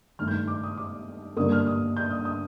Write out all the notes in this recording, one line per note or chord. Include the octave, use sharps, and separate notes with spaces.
G2 D#3 A3 F6
G6
D6
D#6
D6
G2 D3 G3 A#3 D#6
F6
D#6
G6
D#6
D#6